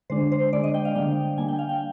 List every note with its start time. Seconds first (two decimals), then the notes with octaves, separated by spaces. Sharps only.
0.10 D3 G#3 D4 C5
0.32 C5
0.53 D3 G#3 D4 D5
0.64 D#5
0.74 G5
0.85 F5
0.95 D3 G3 A#3 D4 G5
1.37 D3 G3 A#3 D4 G#5
1.48 G5
1.59 F5
1.69 G5